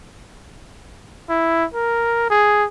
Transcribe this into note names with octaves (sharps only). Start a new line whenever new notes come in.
E4
A#4
G#4